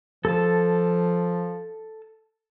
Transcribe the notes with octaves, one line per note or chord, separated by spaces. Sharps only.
F3 A4 A5